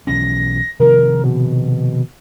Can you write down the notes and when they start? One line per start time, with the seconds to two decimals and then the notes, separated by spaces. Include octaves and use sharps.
0.07 B1 E3 C#4 A#6
0.80 C3 D#3 F3 A#4
1.24 B2